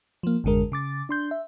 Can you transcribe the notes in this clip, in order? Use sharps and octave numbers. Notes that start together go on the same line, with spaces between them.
F3 A#3
G#1 F2 D3 G#3 A#4
C#3 D6 A6
D4 C6 G6
E5